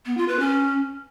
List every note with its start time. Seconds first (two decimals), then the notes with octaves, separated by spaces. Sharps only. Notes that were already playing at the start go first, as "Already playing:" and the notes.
0.06 B3
0.17 F4
0.28 B4
0.39 C#4